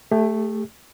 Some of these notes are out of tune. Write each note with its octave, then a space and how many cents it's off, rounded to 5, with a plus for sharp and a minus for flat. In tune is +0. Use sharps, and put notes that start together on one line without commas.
A3 +0 G4 +40